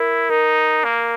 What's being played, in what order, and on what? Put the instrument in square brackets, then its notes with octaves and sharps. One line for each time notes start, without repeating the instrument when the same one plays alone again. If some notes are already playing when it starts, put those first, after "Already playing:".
Already playing: [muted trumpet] E4 [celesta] A#4
[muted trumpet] D#4 [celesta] A#4
[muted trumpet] A#3